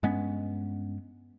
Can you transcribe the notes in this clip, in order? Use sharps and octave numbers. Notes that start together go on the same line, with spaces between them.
G2 G#3 B3 C#4